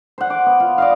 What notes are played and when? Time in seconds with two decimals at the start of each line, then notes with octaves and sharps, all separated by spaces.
0.18 C5 F#5
0.30 D6
0.46 B3
0.60 F4
0.78 D5 D#5 F5